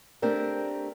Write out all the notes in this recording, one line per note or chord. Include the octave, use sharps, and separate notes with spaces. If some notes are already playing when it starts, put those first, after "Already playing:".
A3 C4 D4 G4 A#4